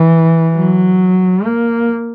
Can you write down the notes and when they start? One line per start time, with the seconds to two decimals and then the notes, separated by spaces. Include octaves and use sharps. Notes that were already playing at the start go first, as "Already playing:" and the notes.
Already playing: E3
0.56 F#3
1.45 A#3